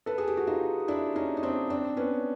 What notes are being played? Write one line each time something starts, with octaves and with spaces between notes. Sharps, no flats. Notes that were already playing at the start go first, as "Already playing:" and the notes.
A4 B4
G#4
G4
F#4
D#4 F4
D4 E4
C#4 D#4
D#4
C4 D4
C4 D4
B3 C#4